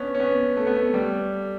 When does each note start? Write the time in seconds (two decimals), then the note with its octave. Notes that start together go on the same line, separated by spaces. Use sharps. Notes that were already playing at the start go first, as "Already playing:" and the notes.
Already playing: B3 C#4 D4
0.15 C#4
0.20 B3
0.57 A3
0.67 B3
0.77 A3
0.94 G3